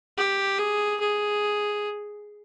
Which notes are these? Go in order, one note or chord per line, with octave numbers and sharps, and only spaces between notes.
G4
G#4
G#4